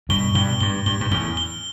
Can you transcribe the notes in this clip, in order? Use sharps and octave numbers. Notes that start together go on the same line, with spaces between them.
G2 B2 G7
G2 B2 G7
G2 G7
G2 G7
G2
E2 A2 G7
G7